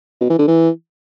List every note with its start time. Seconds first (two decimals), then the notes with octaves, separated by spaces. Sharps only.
0.21 B2
0.30 E3
0.39 D3
0.48 E3